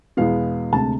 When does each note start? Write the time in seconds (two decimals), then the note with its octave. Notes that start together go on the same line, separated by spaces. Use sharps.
0.17 E2 B2 G#3 B3 F5
0.72 D2 C3 G#3 C4 A5